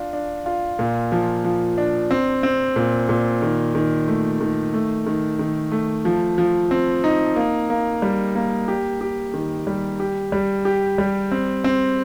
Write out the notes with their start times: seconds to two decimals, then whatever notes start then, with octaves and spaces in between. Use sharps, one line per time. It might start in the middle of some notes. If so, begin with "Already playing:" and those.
Already playing: D4 F4
0.13 D4
0.46 F4
0.79 A#2
1.12 F3
1.45 F3
1.78 D4
2.11 C4
2.43 C4
2.76 A#2
3.09 A#2
3.42 D#3
3.75 D#3
4.08 A3
4.41 D#3
4.74 A3
5.06 D#3
5.39 D#3
5.72 A3
6.05 F3
6.38 F3
6.71 C4
7.04 D#4
7.36 A#3
7.70 A#3
8.02 G3
8.35 A#3
8.68 G4
9.01 G4
9.34 D#3
9.67 G3
10.00 G4
10.32 G3
10.65 G4
10.98 G3
11.32 C4
11.64 C4